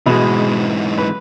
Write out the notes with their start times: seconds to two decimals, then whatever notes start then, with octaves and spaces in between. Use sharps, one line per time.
0.06 G#2 B2 E3 G#3
0.98 B4